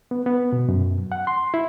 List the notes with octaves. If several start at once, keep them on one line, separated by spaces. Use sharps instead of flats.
B3
B3
B2
F#2
F#5
C6
E4